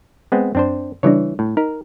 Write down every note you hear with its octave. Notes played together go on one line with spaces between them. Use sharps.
G#3 B3 C4
F#2 C4 D4 C5
C#3 E3 G3 D4 C#5
A2
D#4 A#4